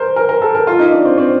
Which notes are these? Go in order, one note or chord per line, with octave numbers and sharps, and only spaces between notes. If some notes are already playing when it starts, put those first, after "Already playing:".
Already playing: A#4 C5
A#4
A#4
A4
A#4
F4
D#4
D4
C4
C4